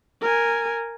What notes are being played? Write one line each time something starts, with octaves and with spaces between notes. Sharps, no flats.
A#4 G#5